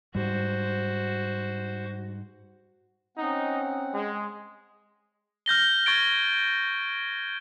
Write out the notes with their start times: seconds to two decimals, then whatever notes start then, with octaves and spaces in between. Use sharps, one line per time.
0.15 G#2 G3 F#4 C5
3.17 C4 C#4 D#4 F#5
3.92 G#3
5.46 F6 G6 A#6 G7
5.86 C#6 F6 G#6 A6 D7 G7